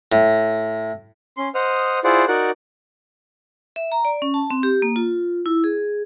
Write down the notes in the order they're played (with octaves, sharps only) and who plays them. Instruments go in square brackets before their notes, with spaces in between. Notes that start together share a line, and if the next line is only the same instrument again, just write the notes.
[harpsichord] A2
[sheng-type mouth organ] C#4 C6
C5 D#5 F#5 D#6 F6
E4 F4 G#4 C5 D5 F#5
D#4 F#4 A#4 D5 F#5 F#6
[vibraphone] E5
A#5
D5
C#4
A5
C4
G4
A#3
F4
E4
G#4